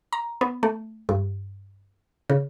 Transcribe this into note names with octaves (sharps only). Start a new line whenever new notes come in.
A#5
B3
A3
G2
C#3